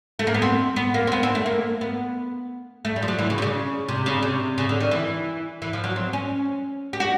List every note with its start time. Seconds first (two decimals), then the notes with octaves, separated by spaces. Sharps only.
0.19 A3
0.27 A#3
0.34 B3
0.42 C4
0.76 B3
0.94 A#3
1.07 C4
1.12 B3
1.23 C4
1.35 A3
1.46 A#3
1.81 B3
2.85 A3
2.96 G3
3.02 F3
3.08 F#3
3.19 E3
3.30 C#3
3.38 C3
3.42 C#3
3.89 C3
4.06 C#3
4.23 C3
4.58 C#3
4.69 D3
4.80 D#3
4.91 E3
5.62 E3
5.73 F3
5.84 F#3
5.96 C4
6.13 C#4
6.93 G4
7.00 F#4